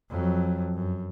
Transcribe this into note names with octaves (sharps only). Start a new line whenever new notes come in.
F2 F#3
F#2